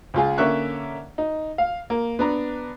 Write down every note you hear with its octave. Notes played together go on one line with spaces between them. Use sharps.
C#2 F4 G#4
D3 A#3 C#4 E5 C#6 F#6
D#4
F5
A#3
B3 D4 A#5